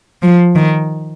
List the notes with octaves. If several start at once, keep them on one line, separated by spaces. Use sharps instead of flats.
F3
D#3